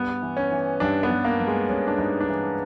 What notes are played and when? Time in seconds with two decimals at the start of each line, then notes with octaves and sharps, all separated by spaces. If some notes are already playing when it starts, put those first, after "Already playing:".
Already playing: G2 B3
0.22 E3
0.37 C#4
0.51 E3
0.80 G2 D4
1.03 B3
1.10 G2
1.25 A#3
1.40 G2
1.48 G#3
1.69 G2 C#4
1.88 D4
1.98 G2 D#4
2.20 D4
2.28 E3 D#4